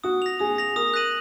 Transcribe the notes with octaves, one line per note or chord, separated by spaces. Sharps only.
F#4 D#6
A#6 F7
G#4 D#6
A#6 F7
A#4 D#6
F#6 A#6 D#7 F#7